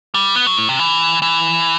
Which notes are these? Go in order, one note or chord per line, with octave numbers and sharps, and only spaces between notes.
G3
B3
F#3
A2
C3
E3
E3